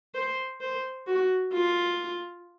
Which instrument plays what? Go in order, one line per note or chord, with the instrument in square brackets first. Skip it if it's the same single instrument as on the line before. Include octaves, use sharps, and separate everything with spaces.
[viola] C5
C5
F#4
F4